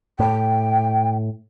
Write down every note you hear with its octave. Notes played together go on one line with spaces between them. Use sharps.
A2 G5